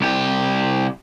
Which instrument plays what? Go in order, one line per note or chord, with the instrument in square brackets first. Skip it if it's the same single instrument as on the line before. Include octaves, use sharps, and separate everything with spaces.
[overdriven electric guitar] C2 G4